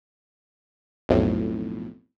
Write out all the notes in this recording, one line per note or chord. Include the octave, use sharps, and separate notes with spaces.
B1 F2 A2